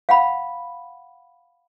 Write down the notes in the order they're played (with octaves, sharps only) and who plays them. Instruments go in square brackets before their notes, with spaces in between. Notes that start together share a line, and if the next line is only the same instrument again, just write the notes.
[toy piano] F5 F#5 B5